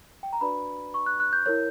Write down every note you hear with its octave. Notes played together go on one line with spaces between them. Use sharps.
G5
A#5
D4 F#4 B4 D5 B5
C#6
F#6
F#6
G6
E4 A#4 C#5 G6